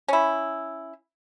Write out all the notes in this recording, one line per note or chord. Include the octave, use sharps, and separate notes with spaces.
C#4 E4